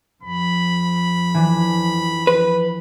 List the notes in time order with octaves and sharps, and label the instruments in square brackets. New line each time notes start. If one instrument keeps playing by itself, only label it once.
[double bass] F2 F3 [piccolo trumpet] B5
[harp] E3 D4
[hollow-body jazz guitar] B4